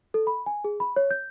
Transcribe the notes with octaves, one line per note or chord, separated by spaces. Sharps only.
A4
B5
G#5
G#4
B5
C#5
G6